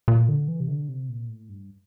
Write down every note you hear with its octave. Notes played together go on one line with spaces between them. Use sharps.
A#2
D3
E3
C3
D3
C3
A#2
A2
G2